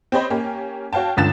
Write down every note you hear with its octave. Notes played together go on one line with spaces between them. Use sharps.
C4 G4 C5 C#5 D#5 B5
A#3 C#4 G4
F#4 C#5 F5 G5 A5
G1 C#2 D3 A6 E7